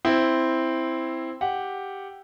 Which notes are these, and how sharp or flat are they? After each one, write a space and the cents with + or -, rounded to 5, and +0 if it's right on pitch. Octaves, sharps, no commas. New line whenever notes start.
C4 +0 E4 +0
G4 +0 F#5 +0